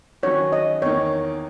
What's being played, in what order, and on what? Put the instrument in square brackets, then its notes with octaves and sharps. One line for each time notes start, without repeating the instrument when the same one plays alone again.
[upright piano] D#3 F#3 C#4 F#4 [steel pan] C#5
[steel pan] D#5
[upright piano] E2 D#3 A#3 D#4 [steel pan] C#5